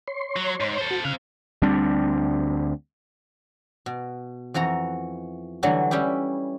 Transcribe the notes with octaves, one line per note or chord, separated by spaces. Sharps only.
C#5 C6
F#3
G#2
A4 C5
F#4
C#3 C4 F5 F#6
D2 G3 C4 D4
B2
F2 E3 F#4 A#5
D3 E3 F#3 G3 A3
G3 C#4 E4 G4